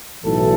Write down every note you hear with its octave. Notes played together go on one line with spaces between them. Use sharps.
B1 A2 E3 A4